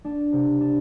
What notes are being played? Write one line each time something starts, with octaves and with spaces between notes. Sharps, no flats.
D4
C3
D4